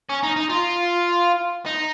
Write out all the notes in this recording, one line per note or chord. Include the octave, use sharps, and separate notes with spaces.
C#4
D#4
D#4
F4
D#4